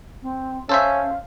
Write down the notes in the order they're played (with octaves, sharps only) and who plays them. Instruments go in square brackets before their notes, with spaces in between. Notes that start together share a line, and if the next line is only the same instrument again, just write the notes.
[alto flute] C4
[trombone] C#4 [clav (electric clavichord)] A4 C5 E5 [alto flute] F5